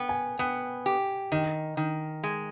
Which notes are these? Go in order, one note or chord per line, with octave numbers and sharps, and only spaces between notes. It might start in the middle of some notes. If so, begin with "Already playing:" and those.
Already playing: B3 G5
G#5
B3 G5
G4
D#3 D#5
D#3
G#3